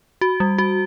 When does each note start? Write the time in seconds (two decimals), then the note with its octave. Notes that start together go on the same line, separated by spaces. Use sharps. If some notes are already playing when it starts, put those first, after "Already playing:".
0.21 F#4
0.40 G3
0.58 F#4